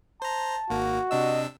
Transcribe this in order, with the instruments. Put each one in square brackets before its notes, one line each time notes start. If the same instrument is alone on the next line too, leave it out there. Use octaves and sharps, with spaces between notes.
[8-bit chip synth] C5 A#5 [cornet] A5
[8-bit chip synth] G#1 A#3 [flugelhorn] F#4
[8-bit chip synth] C3 D4 E6 [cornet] D#5